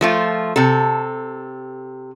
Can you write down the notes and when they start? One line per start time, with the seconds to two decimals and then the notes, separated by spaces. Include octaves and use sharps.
0.01 F3 A3 F4
0.56 C3 A4